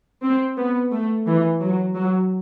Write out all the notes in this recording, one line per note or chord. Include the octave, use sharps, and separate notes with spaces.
C4
B3
A3
E3
F#3
F#3